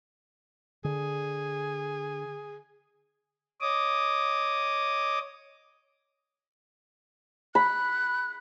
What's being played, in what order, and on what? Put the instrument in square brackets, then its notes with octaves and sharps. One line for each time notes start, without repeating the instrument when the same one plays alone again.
[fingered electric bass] D3 [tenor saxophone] G#4
[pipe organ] C#5 D#5 D6 D#6
[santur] B5 [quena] F#6